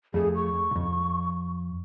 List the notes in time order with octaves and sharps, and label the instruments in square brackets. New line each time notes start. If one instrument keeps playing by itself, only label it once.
[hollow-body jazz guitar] F2 A3 [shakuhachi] G#4
[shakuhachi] C#6
[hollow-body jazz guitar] C2 F2